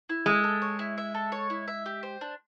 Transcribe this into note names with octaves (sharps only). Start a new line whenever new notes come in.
E4
G#3 E5
A4
C#5
E4
E5
A4
C#5
E4
E5
G4
C5
D4